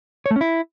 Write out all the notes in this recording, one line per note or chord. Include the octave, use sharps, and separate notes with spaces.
C#5
A3
C#4
E4